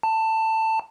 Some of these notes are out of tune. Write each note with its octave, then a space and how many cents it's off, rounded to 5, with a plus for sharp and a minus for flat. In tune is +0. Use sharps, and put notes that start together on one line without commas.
A5 +15